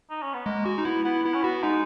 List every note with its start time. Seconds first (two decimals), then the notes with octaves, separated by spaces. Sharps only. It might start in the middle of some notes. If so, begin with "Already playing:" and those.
0.10 D#4
0.22 C#4
0.34 B3
0.46 G#3 A#3
0.65 G#3 F#4
0.78 D#4
0.85 B3 E4
1.05 B3 E4
1.24 B3 E4
1.34 C#4
1.42 B3 F#4
1.63 G#3 D#4